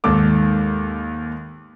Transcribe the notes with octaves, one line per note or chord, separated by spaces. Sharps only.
D#2 G#2 A4 D6